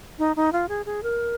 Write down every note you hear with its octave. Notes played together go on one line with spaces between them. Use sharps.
D#4
D#4
F4
G#4
G#4
A#4